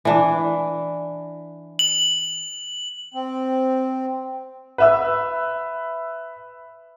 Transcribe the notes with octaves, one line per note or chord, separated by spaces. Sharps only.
E3 D4
F#7
C4
B4 E5 E6